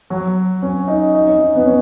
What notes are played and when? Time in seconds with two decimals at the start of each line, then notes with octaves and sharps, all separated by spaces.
0.10 F#3
0.62 C#4
0.87 D#4
1.14 D#4
1.27 C#4
1.40 D#4
1.55 B3
1.66 C#4